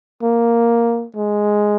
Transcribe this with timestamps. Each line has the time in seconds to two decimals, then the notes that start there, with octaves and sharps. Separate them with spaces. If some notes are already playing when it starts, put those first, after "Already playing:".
0.23 A#3
1.16 G#3